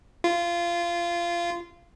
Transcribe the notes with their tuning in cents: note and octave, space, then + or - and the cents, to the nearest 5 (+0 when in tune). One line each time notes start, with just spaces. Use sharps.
F4 -20